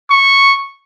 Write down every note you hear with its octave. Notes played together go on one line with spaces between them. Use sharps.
C#6